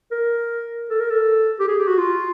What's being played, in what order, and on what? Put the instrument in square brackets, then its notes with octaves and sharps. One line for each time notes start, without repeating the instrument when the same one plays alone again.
[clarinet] A#4
A4
A#4
A4
G4
G#4
G4
F#4
F4